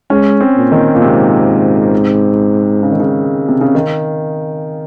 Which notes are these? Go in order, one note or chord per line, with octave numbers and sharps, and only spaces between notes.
G#3 C#4
C4
A#2
D#3
A#2
G#2 C3
C#3
D#3
C#3
C3
C#3
D#3